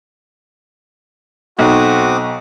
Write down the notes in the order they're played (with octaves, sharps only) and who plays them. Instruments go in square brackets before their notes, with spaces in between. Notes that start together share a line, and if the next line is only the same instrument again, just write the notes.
[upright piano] B1 [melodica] C4 D6 D#6 [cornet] F#4